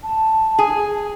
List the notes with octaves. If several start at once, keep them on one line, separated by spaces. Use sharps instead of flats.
A5
G#4
G#5